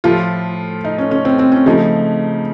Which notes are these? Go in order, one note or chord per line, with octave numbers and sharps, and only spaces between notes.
A2 F3 A3 F4
D#4
C#4
C#4
C4
C4
C#4
C#3 F3 A3 D#4